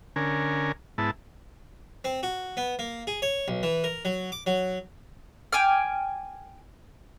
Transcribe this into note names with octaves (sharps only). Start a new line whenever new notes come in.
D3 C#4 A#4 G#5
G#2 B3 E4 A5
C4
F#4
B3
A#3
G#4
C#5
B1
E3
A#4
F#3
D6
F#3
G5 G#5 D6 F6